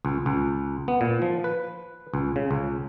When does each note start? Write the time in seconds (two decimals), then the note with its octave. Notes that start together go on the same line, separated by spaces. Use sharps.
0.05 C#2
0.26 C#2
0.88 B3
1.01 A#2
1.22 F3
1.44 B4
2.14 C#2
2.36 C#3
2.51 C#2